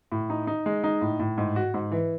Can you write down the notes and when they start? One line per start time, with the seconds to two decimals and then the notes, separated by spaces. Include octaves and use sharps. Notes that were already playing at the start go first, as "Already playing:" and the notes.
0.12 A2
0.30 D#4
0.47 D#4
0.66 G#3
0.84 D#4
1.02 A2
1.20 A2
1.38 G#2
1.56 F#4
1.74 G#2
1.92 E3